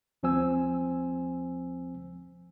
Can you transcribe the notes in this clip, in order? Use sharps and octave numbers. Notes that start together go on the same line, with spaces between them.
D#2 F3 C4 C5 G#5 E6